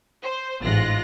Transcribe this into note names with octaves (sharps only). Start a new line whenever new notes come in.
C5
A1 G#2 F4 F#6 A#6